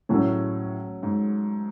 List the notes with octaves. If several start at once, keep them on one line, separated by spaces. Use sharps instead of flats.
A2 F#3 A3 C#4
G#2